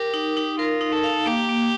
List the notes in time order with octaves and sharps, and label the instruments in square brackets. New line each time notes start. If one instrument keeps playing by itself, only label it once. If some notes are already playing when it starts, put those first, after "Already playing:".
Already playing: [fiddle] G4 [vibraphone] A#4
[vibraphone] D#4
D#4
[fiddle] F4 [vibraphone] A#4
[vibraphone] D#4
[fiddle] A4
[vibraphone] F5
[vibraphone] A#3 [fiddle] G4
[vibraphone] A#3